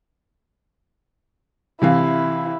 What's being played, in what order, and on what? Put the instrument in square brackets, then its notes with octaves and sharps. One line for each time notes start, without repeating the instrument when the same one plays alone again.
[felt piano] C3 E3 F5 [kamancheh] E4